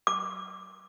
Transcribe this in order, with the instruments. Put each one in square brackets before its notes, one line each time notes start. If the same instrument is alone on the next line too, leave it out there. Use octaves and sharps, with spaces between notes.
[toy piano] D6